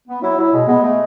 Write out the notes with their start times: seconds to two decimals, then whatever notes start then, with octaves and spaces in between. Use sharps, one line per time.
0.08 B3
0.22 F#3 E4
0.38 F#3 E4
0.53 B2 G#3
0.68 G#3 B3
0.83 G#3 A3